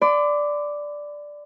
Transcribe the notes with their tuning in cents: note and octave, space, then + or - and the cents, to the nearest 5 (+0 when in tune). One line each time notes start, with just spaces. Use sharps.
D5 +0 B5 +45